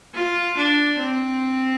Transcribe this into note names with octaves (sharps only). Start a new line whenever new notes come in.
F4
D4
C4